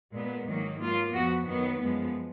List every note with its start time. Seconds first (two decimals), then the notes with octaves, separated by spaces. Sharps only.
0.13 A#2 G#3 B3
0.48 G#2 D#3 F#3 A#3
0.80 G#2 F#3 A#3 F4
1.13 F2 F3 B3 F#4
1.46 F#2 D#3 F#3 B3
1.80 F#2 F3 G#3 B3